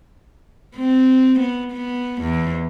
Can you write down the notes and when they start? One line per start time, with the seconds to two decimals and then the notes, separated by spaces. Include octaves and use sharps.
0.76 C4
1.39 B3
1.72 B3
2.22 E2